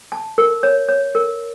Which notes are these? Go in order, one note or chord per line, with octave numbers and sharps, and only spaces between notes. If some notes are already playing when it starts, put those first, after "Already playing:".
A5
A#4
C#5
C#5
A#4